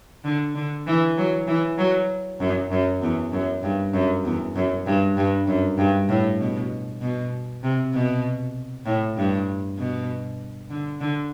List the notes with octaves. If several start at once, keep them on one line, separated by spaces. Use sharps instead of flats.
D3
D3
E3
F#3
E3
F#3
F#2
F#2
E2
F#2
G2
F#2
E2
F#2
G2
G2
F#2
G2
A2
B2
B2
C3
B2
A2
G2
B2
D3
D3